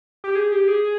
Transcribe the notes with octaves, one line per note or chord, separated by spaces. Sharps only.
G4
G#4
G4
G#4
G#4